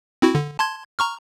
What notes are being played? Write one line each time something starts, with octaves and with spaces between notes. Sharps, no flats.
C4 E4 F#4
D3
A5 C6 G#6
A#5 C#6 F6